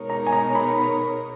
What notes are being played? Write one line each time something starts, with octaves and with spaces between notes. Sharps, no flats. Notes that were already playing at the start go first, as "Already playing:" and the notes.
Already playing: B2 G#3 D#4 A#4 C#5
A#5
G#5
A#5
B5
B5